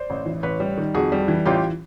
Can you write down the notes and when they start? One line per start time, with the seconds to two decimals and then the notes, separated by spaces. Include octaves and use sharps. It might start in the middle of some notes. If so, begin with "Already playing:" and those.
Already playing: C5 D5
0.10 A1
0.26 E3
0.43 A1 B4 C#5
0.60 G3
0.78 D#3
0.94 F2 F#4 G#4
1.12 G3
1.28 E3
1.45 A1 F4 G4